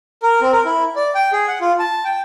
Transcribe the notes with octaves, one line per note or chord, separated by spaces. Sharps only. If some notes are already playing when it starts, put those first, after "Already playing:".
A#4
C4
A#4
E4
D5
G5
G#4
F#5
F4
A5
G5